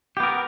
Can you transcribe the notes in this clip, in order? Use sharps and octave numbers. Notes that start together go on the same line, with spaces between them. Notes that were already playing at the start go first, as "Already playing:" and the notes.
B3 G4 A#4